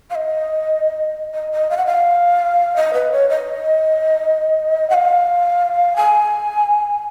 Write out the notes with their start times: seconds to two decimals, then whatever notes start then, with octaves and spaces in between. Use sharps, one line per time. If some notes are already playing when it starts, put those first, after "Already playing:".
0.10 F5
0.15 D#5
1.34 D#5
1.52 D#5
1.70 F5
1.77 F#5
1.86 F5
2.76 D#5
2.94 B4
3.12 C#5
3.29 D#5
4.90 F#5
4.94 F5
5.96 G#5